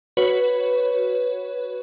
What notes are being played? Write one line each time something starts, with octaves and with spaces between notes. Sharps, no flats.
F#4 B4 C#5